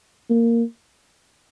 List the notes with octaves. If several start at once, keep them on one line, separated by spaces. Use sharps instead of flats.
A#3